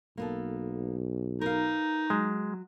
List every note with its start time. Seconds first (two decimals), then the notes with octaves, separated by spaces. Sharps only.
0.17 B1 A#3 B3 A4
1.41 D#4 A#4 B4 F5
2.10 F#3 G#3